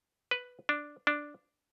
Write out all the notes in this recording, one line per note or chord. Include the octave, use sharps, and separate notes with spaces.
B4
D4
D4